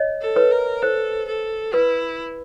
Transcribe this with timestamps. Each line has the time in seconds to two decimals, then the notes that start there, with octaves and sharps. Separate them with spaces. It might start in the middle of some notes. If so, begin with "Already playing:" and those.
Already playing: C#5 D#5
0.21 A4
0.36 B4 C#5
0.52 A#4
0.82 A4 C5
1.28 A4
1.74 E4 B4